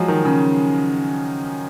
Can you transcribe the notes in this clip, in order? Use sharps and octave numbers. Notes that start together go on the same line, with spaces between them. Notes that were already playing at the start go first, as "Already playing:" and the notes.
Already playing: F3 F#3 G#3
D#3
C#3